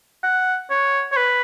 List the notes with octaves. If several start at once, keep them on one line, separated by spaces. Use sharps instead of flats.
F#5
C#5
C#5
B4